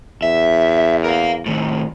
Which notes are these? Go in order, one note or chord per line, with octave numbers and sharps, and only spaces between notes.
E2 E5
A#4 F5
A2 D#3